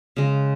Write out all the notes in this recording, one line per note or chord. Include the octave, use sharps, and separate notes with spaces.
C#3 G#3